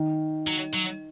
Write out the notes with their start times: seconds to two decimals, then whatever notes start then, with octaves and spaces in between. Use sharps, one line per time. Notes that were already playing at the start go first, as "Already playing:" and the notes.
Already playing: D#3
0.47 F#3
0.74 F#3